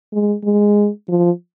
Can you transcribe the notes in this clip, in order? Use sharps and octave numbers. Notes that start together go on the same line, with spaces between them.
G#3
G#3
F3